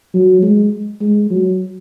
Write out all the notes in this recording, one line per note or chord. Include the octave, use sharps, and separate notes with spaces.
F#3
G#3
G#3
F#3